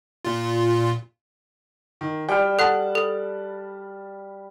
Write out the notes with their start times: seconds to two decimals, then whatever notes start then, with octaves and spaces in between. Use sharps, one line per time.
0.25 A#2 F4
2.01 D#3
2.29 G3 G5 F6
2.59 A4 F#5 A5 F#6
2.95 A4